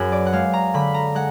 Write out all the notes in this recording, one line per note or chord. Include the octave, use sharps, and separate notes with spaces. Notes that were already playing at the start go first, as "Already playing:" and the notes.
Already playing: F#2 G#4 B4
D5
F#5
G#3 F5
A#5
D3 B5
A#5
G#3 F#5